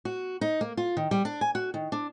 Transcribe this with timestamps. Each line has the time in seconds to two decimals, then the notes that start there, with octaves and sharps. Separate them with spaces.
0.05 F#4
0.41 D#4
0.61 A#3
0.77 F4
0.97 D#3
1.11 G3
1.25 D4
1.41 G#5
1.55 F#4
1.74 D#3
1.92 D4